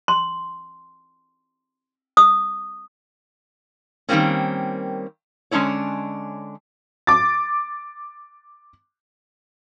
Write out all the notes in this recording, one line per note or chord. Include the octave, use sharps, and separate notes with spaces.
C6
D#6
D#3 G3 G#3 A#3 C4 C#4
D3 G#3 C#4 D4 E4 C#5
D6 A6